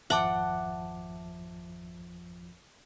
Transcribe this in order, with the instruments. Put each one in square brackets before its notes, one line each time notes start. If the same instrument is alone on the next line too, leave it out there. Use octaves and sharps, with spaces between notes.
[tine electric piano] G#1 F2 F3 [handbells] E5 A5 D6 [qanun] F#5